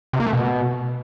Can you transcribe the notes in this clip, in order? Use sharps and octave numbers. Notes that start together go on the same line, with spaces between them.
C3
A#3
A3
B2